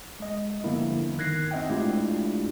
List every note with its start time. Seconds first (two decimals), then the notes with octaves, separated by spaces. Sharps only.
0.20 G#3 D#5
0.64 D3 F3 G3 A#3 B3 E4
1.18 D#3 F#6 G#6 A#6 C7
1.51 C4 D#4 D#5 E5 F#5 G5
1.70 G#3 A3 D4 E4 F4 G4